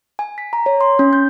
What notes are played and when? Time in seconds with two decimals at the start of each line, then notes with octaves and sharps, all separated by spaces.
0.19 G#5
0.38 B6
0.53 A#5
0.66 C#5
0.81 C6
0.99 C#4
1.13 G6